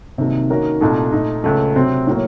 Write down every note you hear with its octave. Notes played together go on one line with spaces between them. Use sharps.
C2 C3 D#3 F#3 A#3
D#3 A#3 C#4 F#4 A#4
C2 A#2 A3 D#4
A#2 A3 D#4
C#2 C#3 A3
C3 F#3 C4
A2 F#3 A#3